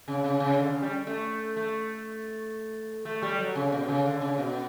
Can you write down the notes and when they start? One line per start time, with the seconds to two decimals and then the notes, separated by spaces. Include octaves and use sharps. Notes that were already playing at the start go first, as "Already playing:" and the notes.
0.08 C#3
0.24 C#3
0.40 C#3
0.58 D3
0.70 C#3
0.82 G3
1.07 A3
1.57 A3
3.05 A3
3.22 G3
3.38 F#3
3.55 C#3
3.72 B2
3.83 B2
3.88 C#3
4.05 D3
4.21 C#3
4.38 B2